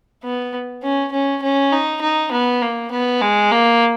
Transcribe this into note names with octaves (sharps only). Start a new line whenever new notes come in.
B3
C#4
C#4
C#4
D#4
D#4
B3
A#3
B3
G#3
A#3